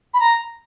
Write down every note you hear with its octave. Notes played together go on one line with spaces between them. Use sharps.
B5
A#5